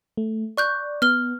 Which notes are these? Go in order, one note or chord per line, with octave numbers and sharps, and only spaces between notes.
A3
D5 C#6 F#6 G6
B3 F6 G7